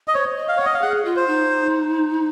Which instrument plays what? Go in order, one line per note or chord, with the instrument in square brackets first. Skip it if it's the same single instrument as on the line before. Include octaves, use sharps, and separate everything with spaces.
[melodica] D#5
[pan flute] C5 [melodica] C#5
[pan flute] D#5
[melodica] F5
[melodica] C#5 [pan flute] F#5
[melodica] D#5
F5
[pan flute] G#4 [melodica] F#5
[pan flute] F4
[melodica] C5
[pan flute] D#4